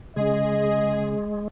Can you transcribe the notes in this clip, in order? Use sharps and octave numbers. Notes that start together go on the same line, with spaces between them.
C#3 G#3 C#4 G#4 D#5